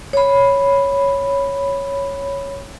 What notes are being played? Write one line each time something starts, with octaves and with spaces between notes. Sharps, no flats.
C#5 B5